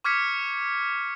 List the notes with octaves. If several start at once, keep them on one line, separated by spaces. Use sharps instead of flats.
C#6 D6 F6 G#6 B6 C#7